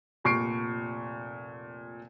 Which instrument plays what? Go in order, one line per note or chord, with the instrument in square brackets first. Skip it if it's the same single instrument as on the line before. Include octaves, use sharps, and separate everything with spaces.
[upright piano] F1 A#2 C#6 C7 D7